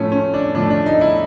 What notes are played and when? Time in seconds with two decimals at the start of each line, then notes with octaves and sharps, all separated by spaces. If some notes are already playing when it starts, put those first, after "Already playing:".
Already playing: A2 F3 A3 C#4
0.12 C#4
0.34 D4
0.55 A2 F3 A3 D4
0.70 D4
0.86 D#4
1.01 E4